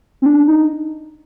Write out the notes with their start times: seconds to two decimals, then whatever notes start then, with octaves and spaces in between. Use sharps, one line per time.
0.22 C4
0.26 D4
0.48 D#4